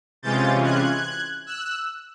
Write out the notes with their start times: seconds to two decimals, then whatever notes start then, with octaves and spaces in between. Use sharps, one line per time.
0.22 C3 E3 G#3 C#4 F4 G6 A6
0.63 F#6 G#6
1.46 E6 F#6